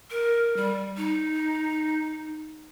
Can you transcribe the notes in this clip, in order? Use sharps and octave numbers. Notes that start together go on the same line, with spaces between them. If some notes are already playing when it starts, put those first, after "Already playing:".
A#4
G3
D#4